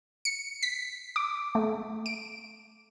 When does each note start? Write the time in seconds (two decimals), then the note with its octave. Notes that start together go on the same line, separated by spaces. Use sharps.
0.25 C#7
0.63 B6
1.16 D6
1.55 A3
2.06 D7